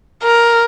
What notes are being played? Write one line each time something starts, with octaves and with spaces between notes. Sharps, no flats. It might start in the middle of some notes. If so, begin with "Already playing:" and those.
A#4